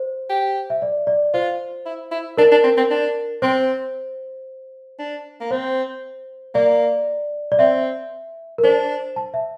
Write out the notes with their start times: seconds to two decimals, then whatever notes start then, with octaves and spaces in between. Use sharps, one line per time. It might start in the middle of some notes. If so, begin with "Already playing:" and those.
Already playing: C5
0.30 G4
0.70 E5
0.82 D5
1.07 D5
1.34 F4 C5
1.86 E4
2.11 E4
2.37 D4 A#4
2.51 D4
2.64 C4
2.77 C4
2.90 D4
3.42 C4 C5
4.99 D4
5.40 A#3
5.51 C4 C5
6.55 A#3 D5
7.52 D5
7.59 C4 E5
8.58 A#4
8.64 D4 C5
9.16 A5
9.34 E5